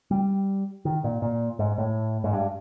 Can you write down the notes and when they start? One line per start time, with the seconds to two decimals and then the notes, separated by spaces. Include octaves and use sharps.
0.11 G3
0.85 D#3
1.04 A#2
1.22 A#2
1.59 G#2
1.78 A2
2.24 G#2
2.33 G2